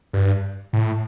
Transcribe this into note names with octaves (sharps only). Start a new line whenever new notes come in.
G2
A2